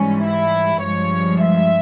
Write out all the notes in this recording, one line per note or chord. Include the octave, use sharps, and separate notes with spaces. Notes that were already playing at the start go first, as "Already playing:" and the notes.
Already playing: G#2 E3 G3 C#4
E4
G2 F3 G#3 C#5
E5